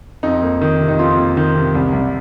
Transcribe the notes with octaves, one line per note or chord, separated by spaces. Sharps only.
F2 D#4
A#3
D#3
C3
D#4
F2 F4
A#3
D#3
C3
C2
C2